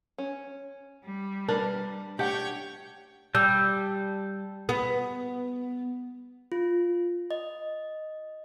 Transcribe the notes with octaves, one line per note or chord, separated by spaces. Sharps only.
C#4
G3
D4 A#4 B4
A3 D4 G4 C#5 F#5 G5
G3 A5 E6 G6
B3
F4
D#5